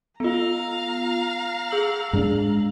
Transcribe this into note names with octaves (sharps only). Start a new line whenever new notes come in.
B3 F4 F5 A#5
G#4 E6 F#7
G#2 G#3 D4